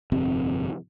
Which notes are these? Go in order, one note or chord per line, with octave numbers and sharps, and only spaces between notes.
G1 F2 C3 C4